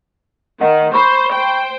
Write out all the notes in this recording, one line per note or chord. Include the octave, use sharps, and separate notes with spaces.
D#3 D#5 F#5
C5 B5 C#6
C5 G5